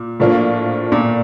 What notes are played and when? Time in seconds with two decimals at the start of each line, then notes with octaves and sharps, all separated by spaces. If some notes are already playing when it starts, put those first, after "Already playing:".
Already playing: A#2
0.20 A2 F3 A#3 D4 F4
0.92 A#2